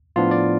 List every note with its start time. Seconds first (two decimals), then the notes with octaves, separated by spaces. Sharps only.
0.16 A2 F3 B3 D4 F4
0.31 D5